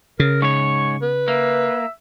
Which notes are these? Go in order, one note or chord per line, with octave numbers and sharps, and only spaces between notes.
C#3 A#4
G#2 C#5 C#6
B4
A#3 E5